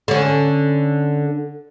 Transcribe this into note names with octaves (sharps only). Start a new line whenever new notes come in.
D3 C#4